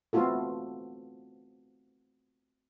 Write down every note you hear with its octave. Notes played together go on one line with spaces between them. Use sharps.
A3 B3 C4 F4 F#4 A4